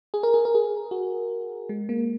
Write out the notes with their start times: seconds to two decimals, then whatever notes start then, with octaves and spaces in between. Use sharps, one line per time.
0.14 G#4
0.23 A#4
0.34 G#4
0.45 A#4
0.55 G#4
0.91 F#4
1.69 G#3
1.89 A#3